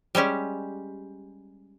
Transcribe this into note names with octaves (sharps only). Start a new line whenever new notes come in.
G3 G#3 C#4 G4